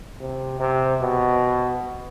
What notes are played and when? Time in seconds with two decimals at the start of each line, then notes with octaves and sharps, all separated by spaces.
0.21 C3
0.60 C3
1.01 B2